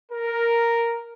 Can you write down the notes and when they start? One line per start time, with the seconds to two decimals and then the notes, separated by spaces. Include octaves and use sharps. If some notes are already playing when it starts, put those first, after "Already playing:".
0.12 A#4